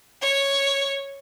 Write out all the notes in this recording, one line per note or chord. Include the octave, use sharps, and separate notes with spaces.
C#5